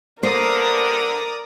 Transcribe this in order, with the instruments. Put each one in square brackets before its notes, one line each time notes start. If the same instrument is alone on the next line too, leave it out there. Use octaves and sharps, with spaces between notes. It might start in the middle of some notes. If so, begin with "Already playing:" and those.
[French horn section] G2 D3 [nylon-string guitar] A#3 C5 [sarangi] A#4 [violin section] D5 A#5 D#6